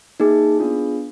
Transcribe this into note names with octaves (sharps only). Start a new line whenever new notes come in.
A#3 D#4 G#4
B3 D4 F4 G#4